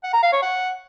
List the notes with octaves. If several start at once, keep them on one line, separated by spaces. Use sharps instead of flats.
F#5
A#5
F5
C#5
F#5